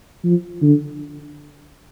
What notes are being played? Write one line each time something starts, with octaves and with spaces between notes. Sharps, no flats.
F3
D3